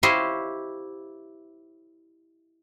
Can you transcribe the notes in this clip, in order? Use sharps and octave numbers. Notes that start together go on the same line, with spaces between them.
E4 G4 C5 C#5 D#5 F5